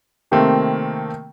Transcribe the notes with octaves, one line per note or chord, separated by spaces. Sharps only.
C3 D#3 A3 A#3 C4